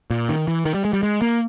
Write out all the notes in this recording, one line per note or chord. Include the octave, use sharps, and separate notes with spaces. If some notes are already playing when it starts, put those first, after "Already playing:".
A#2
D#3
E3
D#3
G3
G#3
G3
G#3
A#3